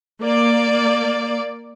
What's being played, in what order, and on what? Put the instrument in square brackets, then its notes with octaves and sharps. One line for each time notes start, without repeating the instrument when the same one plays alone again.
[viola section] A#3 D5